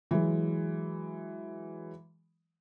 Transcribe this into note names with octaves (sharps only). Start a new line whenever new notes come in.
E3 F#3 G#3